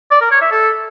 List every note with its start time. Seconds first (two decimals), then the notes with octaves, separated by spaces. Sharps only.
0.11 D5
0.21 A#4
0.31 C#5
0.41 E5
0.51 A4